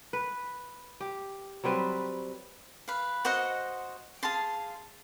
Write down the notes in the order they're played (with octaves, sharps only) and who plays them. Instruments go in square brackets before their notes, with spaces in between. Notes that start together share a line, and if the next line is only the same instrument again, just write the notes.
[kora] B4
G4
F#3 G3 C4 B4
[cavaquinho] B4 F5
F#4 C5 D#5 F#5
G#4 F5 A5 C6